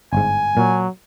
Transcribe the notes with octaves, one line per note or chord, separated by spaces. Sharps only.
G1 G#2 G#5
A#2 F#3